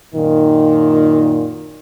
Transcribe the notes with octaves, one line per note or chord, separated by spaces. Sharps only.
F#2 A#2 D#3